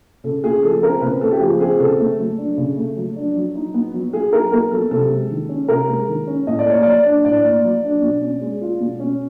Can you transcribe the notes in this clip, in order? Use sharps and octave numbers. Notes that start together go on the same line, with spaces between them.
C#3 A4
A3 G#4
F3 A4
C4 A#4
C#3 B4
A3 A4
G4
F3 G#4
C4 G#4
C#3 A4
A3
F#3
D4
C#3
A3
F#3
D4
F#3
D#4
B3
F#3
F#3 G#4
D#4 A#4
B3 A#4
F#3 A4
C3 A4
G#3
D#3
C#4
C3 A#4
G#3
D#3
C#4
A2 D#5
D5
A#3 C#5
F#3 D5
D4
A2 D5
A#3
F#3
D4
B2
C#4
G#3
F4
B2
C#4